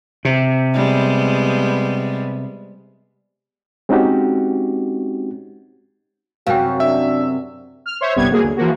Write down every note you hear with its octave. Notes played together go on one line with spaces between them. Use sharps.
C3
G3 G#3 B3
G#3 C4 C#4 D#4 F#4 G4
F#2 C3 F#4 F5 G5
D4 E5
F6
C5 C#5 E5
G1 C2 G3 B3 G#6
F#3 A#3 G#4
D2
E3 F3 A#3 F#4